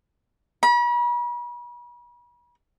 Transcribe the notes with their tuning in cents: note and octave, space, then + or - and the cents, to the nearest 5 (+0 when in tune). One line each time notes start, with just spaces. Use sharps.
B5 -40